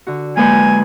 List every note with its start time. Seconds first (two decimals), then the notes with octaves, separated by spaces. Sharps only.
0.07 D3 F#4
0.37 F#3 G#3 A#3 B4 G#5 G6